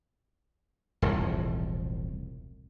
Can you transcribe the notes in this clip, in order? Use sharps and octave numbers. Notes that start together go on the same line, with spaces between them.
E1 C2 A2 F3